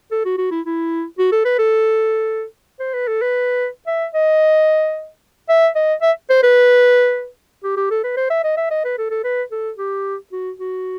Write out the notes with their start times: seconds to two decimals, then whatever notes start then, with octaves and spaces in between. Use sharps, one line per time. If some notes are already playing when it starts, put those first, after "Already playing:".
0.11 A4
0.25 F#4
0.38 F#4
0.51 E4
0.65 E4
1.18 F#4
1.32 A4
1.45 B4
1.59 A4
2.80 C5
2.94 B4
3.08 A4
3.22 B4
3.87 E5
4.14 D#5
5.49 E5
5.75 D#5
6.02 E5
6.30 C5
6.43 B4
7.64 G4
7.77 G4
7.91 A4
8.04 B4
8.17 C5
8.30 E5
8.44 D#5
8.57 E5
8.71 D#5
8.85 B4
8.98 A4
9.11 A4
9.24 B4
9.52 A4
9.78 G4
10.32 F#4
10.59 F#4